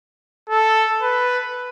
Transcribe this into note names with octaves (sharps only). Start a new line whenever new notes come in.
A4
B4